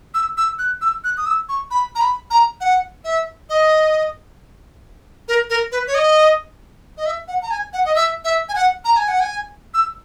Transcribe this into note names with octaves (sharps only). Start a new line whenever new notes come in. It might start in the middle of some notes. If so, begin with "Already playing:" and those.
E6
E6
F#6
E6
F#6
D#6
E6
C#6
B5
A#5
B5
A#5
F#5
E5
D#5
A#4
A#4
B4
C#5
D#5
D#5
E5
F#5
A#5
G#5
F#5
D#5
E5
E5
G#5
F#5
A#5
G#5
F#5
G#5
E6